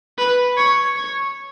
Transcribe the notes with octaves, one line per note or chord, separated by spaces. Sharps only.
B4
C#5
C#5